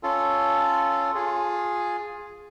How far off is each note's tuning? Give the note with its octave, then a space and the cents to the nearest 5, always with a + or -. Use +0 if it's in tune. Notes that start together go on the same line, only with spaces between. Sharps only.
C#4 +0 F4 -10 A4 +0
F4 +15 G#4 +0